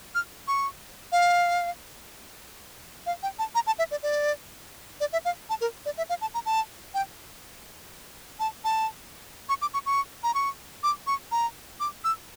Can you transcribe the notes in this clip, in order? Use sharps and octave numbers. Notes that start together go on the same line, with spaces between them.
F6
C#6
F5
F5
G5
A5
A#5
A5
E5
D5
D5
D5
E5
F5
A5
A#4
D5
E5
F5
A5
A#5
A5
G5
A5
A5
C#6
D6
C#6
C#6
A#5
C#6
D6
C#6
A#5
D6
E6